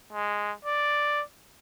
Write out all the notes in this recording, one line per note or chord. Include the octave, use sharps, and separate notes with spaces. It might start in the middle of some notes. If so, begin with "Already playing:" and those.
G#3
D5